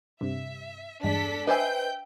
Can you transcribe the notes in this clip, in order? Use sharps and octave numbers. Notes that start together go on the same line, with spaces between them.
G2 C3 E5
E2 G2 G#3 D4 A4 B6
B4 C5 D#5 E5 G5 G#5 G6